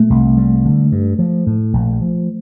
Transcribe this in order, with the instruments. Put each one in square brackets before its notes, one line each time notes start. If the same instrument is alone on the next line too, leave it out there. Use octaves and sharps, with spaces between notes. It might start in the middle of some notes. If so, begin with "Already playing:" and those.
Already playing: [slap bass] A#2 [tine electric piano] A3
[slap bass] C2
G3
D3
G2
F3
A2
A#1
F3